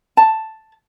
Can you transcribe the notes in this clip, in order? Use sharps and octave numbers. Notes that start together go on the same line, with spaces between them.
A5